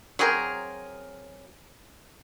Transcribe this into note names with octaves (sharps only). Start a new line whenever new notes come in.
F#3 C4 G#4 A#4